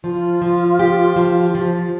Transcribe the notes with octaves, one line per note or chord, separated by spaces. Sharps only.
F3 F4
F3
G4
F3
F3